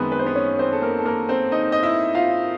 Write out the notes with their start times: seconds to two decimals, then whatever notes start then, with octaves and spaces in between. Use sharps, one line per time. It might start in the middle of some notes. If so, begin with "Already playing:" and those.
Already playing: F#2 D#3 G#3 B3 C4 B4 C5
0.12 B4
0.19 C5
0.26 B3 B4
0.35 C#4 C#5
0.59 C4 C5
0.72 A4
0.82 A#3 A#4
0.99 A4
1.05 A#3 A#4
1.29 C4 C5
1.52 D#4 D#5
1.72 D#5
1.83 E4 E5
2.15 F4 F5